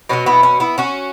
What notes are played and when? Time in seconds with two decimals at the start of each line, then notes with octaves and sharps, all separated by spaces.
0.09 B2 F#3 C#4 F#4
0.26 B3 E4
0.43 C#4
0.60 B3 E4
0.78 C#4 F#4